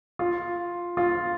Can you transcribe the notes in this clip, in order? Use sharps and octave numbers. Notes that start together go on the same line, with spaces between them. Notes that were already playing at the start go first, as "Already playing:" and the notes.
F4
F4